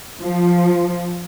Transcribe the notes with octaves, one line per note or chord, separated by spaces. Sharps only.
F3